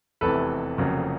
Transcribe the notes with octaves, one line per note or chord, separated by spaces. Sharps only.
F1 E2 C3 E3 A4 B4
F1 F2 C#3 F#3 A#3